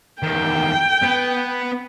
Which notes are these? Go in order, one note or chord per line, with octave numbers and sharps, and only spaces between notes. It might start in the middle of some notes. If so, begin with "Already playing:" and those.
E2 D#3 G5
B3 B4